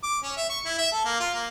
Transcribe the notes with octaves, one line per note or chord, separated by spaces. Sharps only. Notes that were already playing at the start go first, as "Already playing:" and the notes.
D6
C#4
E5
C#6
E4
E5
A4
A#3
F4
A#3